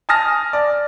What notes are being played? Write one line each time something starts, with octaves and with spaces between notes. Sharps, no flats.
G#5 A5 D#6 F6 A#6
D5